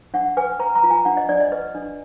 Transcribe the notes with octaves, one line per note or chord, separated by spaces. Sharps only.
D4 F#5
B4 G#5
B4 A#5
A#5
F4
G#5
D4 F#5
D#5
D4 D5
D#5
B4 D#5
D4